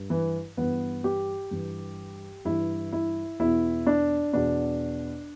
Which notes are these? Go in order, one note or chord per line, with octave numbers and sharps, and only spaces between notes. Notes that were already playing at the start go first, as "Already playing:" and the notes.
Already playing: G2
E3
G2 E3 B3
G4
G2 E3
G2 E3 E4
E4
E2 B2 E4
D4
E2 B2 D4